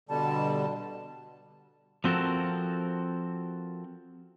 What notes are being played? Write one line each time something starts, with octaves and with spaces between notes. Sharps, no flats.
B2 D3 G3 A5
F3 C4 F#4 A4 A#4